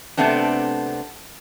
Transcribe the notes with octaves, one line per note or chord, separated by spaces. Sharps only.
C3 A3 B3 C4 D4